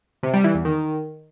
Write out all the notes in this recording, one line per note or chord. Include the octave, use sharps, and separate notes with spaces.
C3
G3
E3
E2
D#3